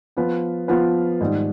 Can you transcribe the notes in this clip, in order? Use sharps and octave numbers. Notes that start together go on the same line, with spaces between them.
F3 B3 F4 B4
F3 B3 F4 B4
G#2 D#3 G3